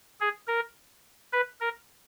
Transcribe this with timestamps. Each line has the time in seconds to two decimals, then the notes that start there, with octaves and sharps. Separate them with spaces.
0.20 G#4
0.47 A#4
1.33 B4
1.61 A#4